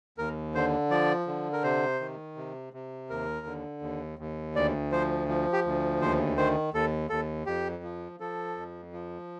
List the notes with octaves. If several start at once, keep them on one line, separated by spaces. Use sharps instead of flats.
D#2 A#4
D3 C5
F3 D5
D3
A#4
C3 C5
D#3
C3
C3
D#2 A#4
D3
D#2
D#2
D2 D5
F3 C5
F3
G4
D2
D#2 C5
D#3 C5
D#2 A4
D#2 A4
F2 G4
F3
F3 A4
F2
F3